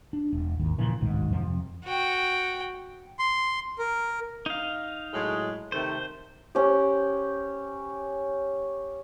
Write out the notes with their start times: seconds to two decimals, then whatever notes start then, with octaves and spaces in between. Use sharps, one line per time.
0.13 D4
0.32 E1
0.59 G#1 D#2
0.78 A#2 C#3 E3 F3
1.01 D1 B1 G#2 D#3
1.32 F2 C3 F3
1.84 F#4 G5
3.19 C6
3.79 A#4
4.46 D#4 F5
5.13 A2 F#3 G#3
5.72 C3 D#3 A3 C5
6.55 C#4 G4